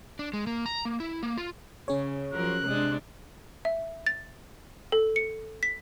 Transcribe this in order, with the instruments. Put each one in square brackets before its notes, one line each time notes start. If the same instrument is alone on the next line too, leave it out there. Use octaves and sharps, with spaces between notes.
[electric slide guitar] D4
G#3
A#3
A#5
A#3
E4
A#3
F4
[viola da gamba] C#3 [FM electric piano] C#4 G#4 C#5
[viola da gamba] F3 F#3 A#4 [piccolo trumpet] F#6
[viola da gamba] C3 G#3 D4
[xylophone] E5
A6
A4
C#7
B6